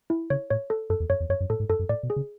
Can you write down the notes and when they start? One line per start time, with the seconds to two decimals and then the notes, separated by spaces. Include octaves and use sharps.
0.10 E4
0.30 C#3 C#5
0.50 A2 C#5
0.70 A4
0.90 F#2 A4
1.00 E2
1.09 F#2 C#5
1.20 E2
1.29 F#2 C#5
1.40 F#2
1.50 A2 A4
1.60 G#2
1.69 F#2 A4
1.79 F#2
1.89 A2 D5
2.03 B2
2.10 G#4
2.16 C#3